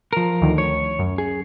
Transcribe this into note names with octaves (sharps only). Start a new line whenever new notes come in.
F3 A#4
D2 D#3
C#5
F#2
G#4